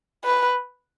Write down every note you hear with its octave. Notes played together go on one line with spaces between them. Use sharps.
B4